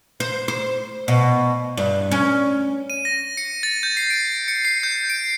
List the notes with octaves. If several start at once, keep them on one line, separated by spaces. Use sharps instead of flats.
C5
C5
B2
G2
C#4
D#7
A#6
C#7
A6
G6
C7
D7
C#7
C7
G6
D7